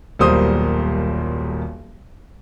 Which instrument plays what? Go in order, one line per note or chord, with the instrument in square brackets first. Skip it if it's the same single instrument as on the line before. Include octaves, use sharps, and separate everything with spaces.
[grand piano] D#1 B1 G3 A#3 C5 D#6